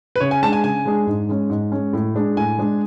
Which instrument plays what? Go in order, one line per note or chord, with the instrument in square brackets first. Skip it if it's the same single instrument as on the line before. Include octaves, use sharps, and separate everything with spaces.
[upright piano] B4
[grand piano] C#3 [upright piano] C#5
[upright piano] G#5
[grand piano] G#3 D4 G#4 [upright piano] A5
[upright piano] G#5
[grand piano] C#3 [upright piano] G#5
[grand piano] G#3 D4 G#4
G#2
G#3 C#4
G#2
G#3 C#4
A2
G#3 D4 G#4
[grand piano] A2 [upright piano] G#5
[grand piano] G#3 D4 G#4